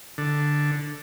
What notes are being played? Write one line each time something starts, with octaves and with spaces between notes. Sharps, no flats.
D3